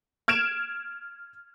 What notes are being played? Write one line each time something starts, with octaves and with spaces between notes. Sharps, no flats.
F6 G#6 D7 E7 F7